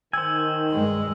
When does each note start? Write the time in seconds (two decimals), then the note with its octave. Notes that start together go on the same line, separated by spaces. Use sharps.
0.13 D#3 C5 G#5 E6
0.70 G2 G#3